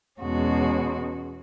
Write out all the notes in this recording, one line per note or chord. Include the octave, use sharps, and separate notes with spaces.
E2 B2 G#3 C#4 F#4